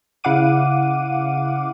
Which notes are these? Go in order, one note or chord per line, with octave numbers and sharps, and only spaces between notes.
C#3 E4 F5 F#5 D6 D#7